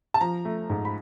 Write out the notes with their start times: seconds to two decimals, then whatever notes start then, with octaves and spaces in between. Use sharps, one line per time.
0.14 A5
0.21 F3 A#5
0.45 A3
0.70 G#2
0.85 B5